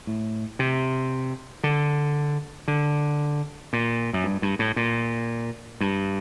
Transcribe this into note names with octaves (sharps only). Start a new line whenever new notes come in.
A2
C3
D3
D3
A#2
F#2
G2
G2
A2
A#2
G2